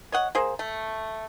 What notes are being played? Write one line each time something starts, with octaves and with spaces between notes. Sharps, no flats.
C#5 D#5 F#5
A#3 G#4 C5
A3